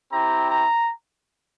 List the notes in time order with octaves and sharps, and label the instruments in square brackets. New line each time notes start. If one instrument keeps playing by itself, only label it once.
[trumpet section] C4 E4 G4 A#5
A#5